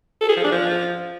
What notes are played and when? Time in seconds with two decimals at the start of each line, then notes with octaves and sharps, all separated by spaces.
0.21 A4
0.29 G#4
0.36 F3
0.44 D4
0.52 F3